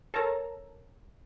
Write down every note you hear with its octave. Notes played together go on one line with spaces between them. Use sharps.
A4 A#4 C#5 A5 A#5